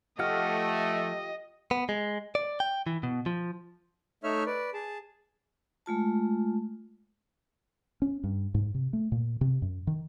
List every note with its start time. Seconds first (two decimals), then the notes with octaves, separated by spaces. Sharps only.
0.19 F3 A3 F4 G4 D#5 F#5 F6
1.71 B3
1.89 G#3
2.35 D5
2.60 G5
2.87 E3
3.03 B2
3.26 F3
4.23 A3 D#4 C#5 E5 F6
4.46 B4 D5
4.74 G#4 A5
5.86 G#3 A3 F4 A5
8.02 C#4
8.24 G2
8.54 G#2
8.74 C3
8.93 A3
9.12 A#2
9.41 C3
9.62 F#2
9.87 D#3